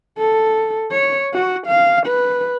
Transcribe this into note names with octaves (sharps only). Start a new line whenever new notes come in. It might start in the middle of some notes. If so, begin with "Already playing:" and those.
A4
C#5
F#4
F5
B4